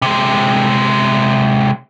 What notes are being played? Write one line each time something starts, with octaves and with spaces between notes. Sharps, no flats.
C3 G#3